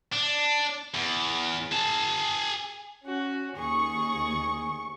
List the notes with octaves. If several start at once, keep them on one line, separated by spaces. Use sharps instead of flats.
D4
E2
G#4 A5
C#4 F#4
D#2 G#4 C#6